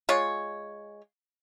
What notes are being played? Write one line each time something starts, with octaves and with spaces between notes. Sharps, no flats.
G#3 F4 C#5